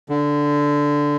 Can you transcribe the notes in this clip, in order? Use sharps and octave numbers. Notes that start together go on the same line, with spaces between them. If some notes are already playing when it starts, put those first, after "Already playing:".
D3